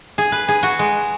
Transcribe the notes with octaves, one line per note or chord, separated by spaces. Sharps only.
G#4
B4
G#4
F#4
G#3